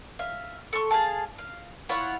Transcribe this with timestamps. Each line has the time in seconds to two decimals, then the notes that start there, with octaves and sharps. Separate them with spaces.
0.19 E5 F5
0.73 A4 C6 C#6
0.91 G#4 B4 F5 A5
1.39 F5
1.89 E4 F4 C#5 F#5